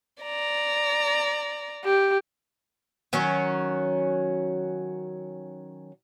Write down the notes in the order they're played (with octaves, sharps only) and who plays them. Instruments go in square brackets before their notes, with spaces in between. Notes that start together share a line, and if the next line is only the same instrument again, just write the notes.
[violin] D5 A#5
[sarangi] G4
[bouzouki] D#3 F#3 C#4